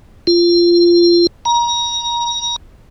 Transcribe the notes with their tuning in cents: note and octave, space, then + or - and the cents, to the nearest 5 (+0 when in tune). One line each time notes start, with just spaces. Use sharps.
F4 -15
A#5 +25